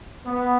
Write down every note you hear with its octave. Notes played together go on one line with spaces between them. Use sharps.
B3